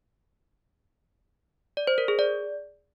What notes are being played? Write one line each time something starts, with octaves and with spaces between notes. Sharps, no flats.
D5
C5
A#4
G#4
D5